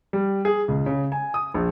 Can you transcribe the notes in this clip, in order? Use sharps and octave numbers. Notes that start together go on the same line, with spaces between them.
G3
G#4
C#2
C#3
G#5
D#6
A#1